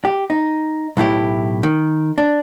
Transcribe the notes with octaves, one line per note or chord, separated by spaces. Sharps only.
G4
D#4
B1 A2 E4 G4
D#3
D4